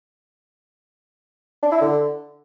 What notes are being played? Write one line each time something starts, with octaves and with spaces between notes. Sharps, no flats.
D4
E4
D3